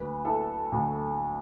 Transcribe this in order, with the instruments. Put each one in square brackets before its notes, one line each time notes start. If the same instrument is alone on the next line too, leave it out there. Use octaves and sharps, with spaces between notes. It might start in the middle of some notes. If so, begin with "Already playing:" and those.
Already playing: [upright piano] D2 B4
E4 A4
D2